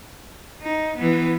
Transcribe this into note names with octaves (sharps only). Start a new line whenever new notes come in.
D#4
E3 B3